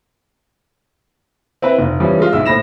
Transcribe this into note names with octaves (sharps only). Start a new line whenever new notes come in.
C4 E4 B4
F1
E3 F3 G3 C#4
G#3 F4
B1 E4 E6
A2 C5 B5 A#6 E7